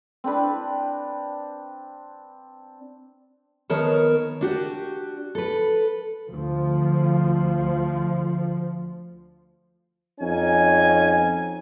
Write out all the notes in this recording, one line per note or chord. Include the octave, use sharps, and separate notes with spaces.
C4 D4 B4
D#3 B3 A#4 C#5 A5
D4 F#4 G4
A4 B4
D2 F3
F2 C#4 D#4 G#5